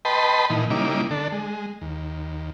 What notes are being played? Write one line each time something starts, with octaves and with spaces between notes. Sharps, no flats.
B4 D#5 G5 A5 B5 C6
A#2 E3 D#4
C#3 G3 A#3 D#4 E4 D6
D3 D4 A4
G#3
D#2